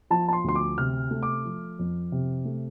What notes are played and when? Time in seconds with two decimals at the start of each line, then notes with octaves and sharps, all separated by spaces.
0.10 F3 A5
0.28 A5
0.33 C6
0.44 D2 C6
0.55 D6
0.78 C3 F6
1.11 A3
1.23 D6
1.45 F3
1.79 F2
2.12 C3
2.45 A3